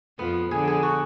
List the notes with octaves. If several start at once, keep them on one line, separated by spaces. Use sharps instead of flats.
F2 F3 B3
D3 G#4
G#4
F#4